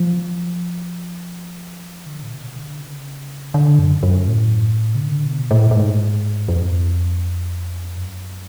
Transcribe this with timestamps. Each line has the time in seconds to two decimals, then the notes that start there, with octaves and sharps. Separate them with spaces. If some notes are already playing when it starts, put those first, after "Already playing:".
Already playing: F3
2.06 D3
2.23 A2
2.31 B2
2.56 D3
2.80 C#3
3.54 D3
3.79 F#2
4.03 F#2
4.28 A2
4.95 C#3
5.01 D3
5.27 B2
5.51 A2
5.71 A2
5.75 G#2
6.48 F2
7.97 F#2